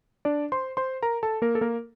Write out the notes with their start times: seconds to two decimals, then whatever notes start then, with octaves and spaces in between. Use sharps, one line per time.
0.25 D4 D5
0.52 C5 C6
0.77 C5 C6
1.03 A#4 A#5
1.23 A4 A5
1.42 A#3 A#4
1.55 A4
1.61 A#3 A#4